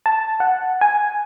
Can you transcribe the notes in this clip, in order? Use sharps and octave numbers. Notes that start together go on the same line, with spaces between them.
A5
F#5
G#5